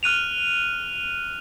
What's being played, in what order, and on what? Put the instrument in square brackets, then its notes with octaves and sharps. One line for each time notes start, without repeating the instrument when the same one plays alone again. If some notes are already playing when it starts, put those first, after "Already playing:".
[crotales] F6 F#6 D#7 F7